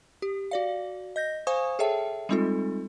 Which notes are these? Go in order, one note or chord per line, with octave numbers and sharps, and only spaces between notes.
G4
F#4 D5 F5
D#5 G6 A#6
C5 F5 G#5 C#6 D#6
G#4 A4 C#5 E5 G5 A5
G3 G#3 C4 D#4 F4 A4